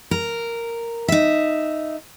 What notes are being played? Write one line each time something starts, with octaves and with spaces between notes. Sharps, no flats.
A#4
D#4 E5